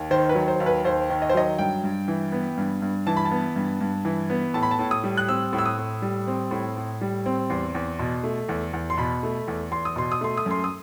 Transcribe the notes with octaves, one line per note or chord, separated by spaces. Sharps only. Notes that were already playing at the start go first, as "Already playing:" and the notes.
Already playing: D#2
D#3 C5
B4
F#3
C5
D#2
B4
D#2 C5
D#3
D#5
C5
F#3 D#5
G2 G5
G2
E3
B3
G2
G2
E3 A5
B5
A5
B3
G2
G2
E3
B3
A2 A5
B5
A5
A2
D#6
G3
F#6
C4 E6
A2
E6
D#6
A2
G3
C4
A2
A2
G3
C4
E2 C6
E2
B2
A3
E2
E2
C6
B2 B5
A3
E2
E2 C6
D#6
B2 C6
D#6
A3 C6
D#6
F#2 C6
D#6